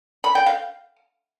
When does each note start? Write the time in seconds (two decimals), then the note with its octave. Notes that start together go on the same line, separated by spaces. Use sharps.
0.24 B5
0.35 G5
0.46 F5